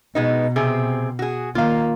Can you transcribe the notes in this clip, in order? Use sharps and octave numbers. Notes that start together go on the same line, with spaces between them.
B2 G#3 B3 D#4
C3 C4 G#4
F#4 G#4
D#3 A#3 F4 F5